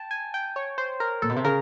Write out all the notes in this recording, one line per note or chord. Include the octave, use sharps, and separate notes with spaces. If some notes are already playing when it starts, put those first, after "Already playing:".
Already playing: G5 A5
G#5
G5
C#5
C5
A#4
A#2 A4
B2
C3
C#3 A#4